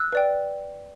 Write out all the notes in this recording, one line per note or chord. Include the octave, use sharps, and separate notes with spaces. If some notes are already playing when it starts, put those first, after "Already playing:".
Already playing: E6 F#6
B4 D5 G5